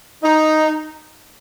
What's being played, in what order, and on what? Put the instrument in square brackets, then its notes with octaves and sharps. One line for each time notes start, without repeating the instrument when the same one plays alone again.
[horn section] D#4